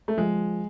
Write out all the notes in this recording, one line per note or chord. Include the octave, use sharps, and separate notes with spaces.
A3
F3 G#3